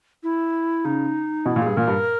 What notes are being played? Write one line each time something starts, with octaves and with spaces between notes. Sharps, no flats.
E4
C#3 D#4
B2 E4
A#2
G2 G#4
A#2 A#4
G2